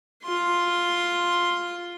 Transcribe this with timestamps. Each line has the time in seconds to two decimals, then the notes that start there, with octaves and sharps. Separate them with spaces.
0.23 F4 C6